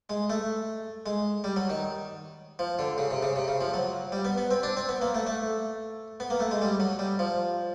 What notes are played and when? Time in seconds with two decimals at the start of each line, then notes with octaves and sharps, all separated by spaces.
0.10 G#3
0.30 A3
1.06 G#3
1.44 G3
1.56 F#3
1.70 D#3
2.59 F3
2.79 D3
2.98 C#3
3.10 C3
3.23 C#3
3.36 C3
3.48 C#3
3.61 F3
3.74 F#3
4.12 G3
4.25 B3
4.38 B3
4.51 C4
4.63 D4
4.77 C4
4.89 B3
5.01 A#3
5.15 A3
5.27 A3
6.20 B3
6.30 A#3
6.40 A3
6.51 G#3
6.62 G3
6.80 F#3
6.99 G3
7.19 F3